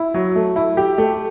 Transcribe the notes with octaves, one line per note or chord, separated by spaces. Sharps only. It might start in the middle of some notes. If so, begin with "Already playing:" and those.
Already playing: E4
F#3
A3
E4
G4
A3